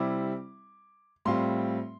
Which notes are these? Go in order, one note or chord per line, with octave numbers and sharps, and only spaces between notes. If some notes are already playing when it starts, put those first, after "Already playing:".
Already playing: C3 G3 C4 E4 D6
A2 G3 C4 F4 C6